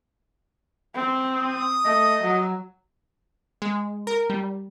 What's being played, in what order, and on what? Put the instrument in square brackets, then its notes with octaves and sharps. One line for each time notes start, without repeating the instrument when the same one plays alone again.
[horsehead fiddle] C4
[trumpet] D#6
[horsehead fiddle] A3 [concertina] D#5
[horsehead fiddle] F#3
[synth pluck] G#3
A#4
G3